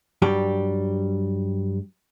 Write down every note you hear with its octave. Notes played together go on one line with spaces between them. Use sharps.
G2 F#3 G3 G4